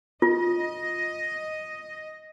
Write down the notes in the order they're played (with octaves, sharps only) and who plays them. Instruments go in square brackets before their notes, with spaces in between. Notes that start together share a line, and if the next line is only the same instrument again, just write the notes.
[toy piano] F4 [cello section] D#5